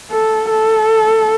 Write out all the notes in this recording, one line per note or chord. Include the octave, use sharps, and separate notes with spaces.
A4
A4